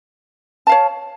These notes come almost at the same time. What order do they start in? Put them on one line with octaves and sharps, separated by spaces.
A5 F5 C#5